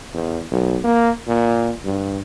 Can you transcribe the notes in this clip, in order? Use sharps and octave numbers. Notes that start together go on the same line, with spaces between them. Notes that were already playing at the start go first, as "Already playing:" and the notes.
E2
B1
A#3
A#2
G2